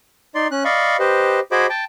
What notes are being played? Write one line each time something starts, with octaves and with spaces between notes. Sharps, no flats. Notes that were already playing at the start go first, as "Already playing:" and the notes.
D#4 D5 C6
C#4 F#6
D5 D#5 F5 B5 C#6
G4 B4 C5 D#5
F#4 G#4 C5 D#5 B5 D6
G5 A5